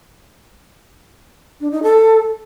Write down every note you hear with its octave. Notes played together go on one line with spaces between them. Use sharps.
D4
D#4
A4